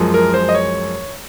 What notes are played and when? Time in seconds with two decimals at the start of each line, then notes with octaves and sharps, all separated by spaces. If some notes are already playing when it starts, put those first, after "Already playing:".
Already playing: F#2 F3 G#3
0.14 A#4
0.34 C5
0.49 D#5
0.54 C#5